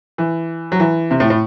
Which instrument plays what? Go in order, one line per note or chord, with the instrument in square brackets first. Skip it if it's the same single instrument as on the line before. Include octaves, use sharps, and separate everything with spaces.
[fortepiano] E3
F#3
E3
C3
A2
A2